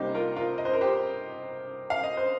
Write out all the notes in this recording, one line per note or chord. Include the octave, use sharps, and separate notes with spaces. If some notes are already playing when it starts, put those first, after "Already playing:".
Already playing: C2 C3 G3 A#3 D#4 G4 C5
F4 A#4
F4 A#4
D#5
C5
A#4
G4 C5
F5
D#5
C5